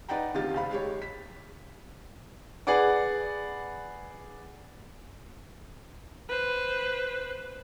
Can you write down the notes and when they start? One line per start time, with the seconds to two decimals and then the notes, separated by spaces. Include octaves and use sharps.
0.08 D#4 B4 D5 F#5 G5 A#5
0.34 D2 C3 D#3 F4 G4 A6
0.54 F#1 F5 B5
0.71 G#3 G4 C#5
1.02 B6
2.67 G#4 B4 D5 F#5 D6
6.29 B4 C5